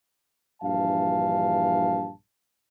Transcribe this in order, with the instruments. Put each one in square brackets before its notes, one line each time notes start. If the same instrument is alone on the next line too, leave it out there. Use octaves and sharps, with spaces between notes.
[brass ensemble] A#1 G2 E3 F5 A5